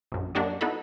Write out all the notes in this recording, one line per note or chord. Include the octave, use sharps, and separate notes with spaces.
A#1 F#2
F#2 A#3 D4 F#4 G4 D#5
B3 D#4 E4 F#4 A4 B5